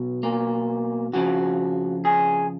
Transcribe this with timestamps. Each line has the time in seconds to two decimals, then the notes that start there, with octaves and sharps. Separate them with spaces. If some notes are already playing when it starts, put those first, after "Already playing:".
Already playing: B1 B2
0.23 A#3
1.13 F2 C#3 F3 F#4
2.05 G#4